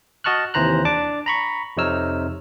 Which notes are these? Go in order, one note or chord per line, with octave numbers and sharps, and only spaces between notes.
F#4 D#5 A5 C#6 F6 F#6
D#2 C3 E3 C5 A#5 F#6
D4 A5 D6
A#5 B5 C#6
F2 C3 D#4 C#5 E6 F6